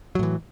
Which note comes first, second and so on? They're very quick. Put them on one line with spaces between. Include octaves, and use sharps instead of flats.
F#3 A2 E3